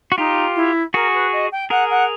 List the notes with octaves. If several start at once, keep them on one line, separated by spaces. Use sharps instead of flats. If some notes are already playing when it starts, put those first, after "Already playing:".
F#4
D#4 F4 G4
E4
F#4 G#4 A#4
B4
D#5
G5
G#4 A#4 F#5
F#5